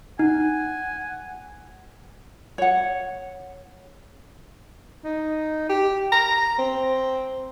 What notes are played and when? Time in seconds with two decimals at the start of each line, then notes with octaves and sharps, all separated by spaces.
0.19 D#4 F#5 G#5
2.58 C#5 F#5
5.04 D#4
5.69 G4
6.12 A#5
6.58 C4